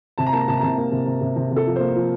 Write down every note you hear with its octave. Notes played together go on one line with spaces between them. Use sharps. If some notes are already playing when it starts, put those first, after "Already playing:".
C3 A5
A#5
A#3 A5
A#5
C3 A5
A#5
C3 A5
A#3
C3
C3
C3
C3
C3 A4
F3
A#3 C5
F3